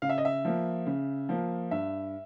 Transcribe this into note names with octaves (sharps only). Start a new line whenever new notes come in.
C#3 F5
E5
D#5
E5
F3 A#3
C#3
F3 A#3
G2 E5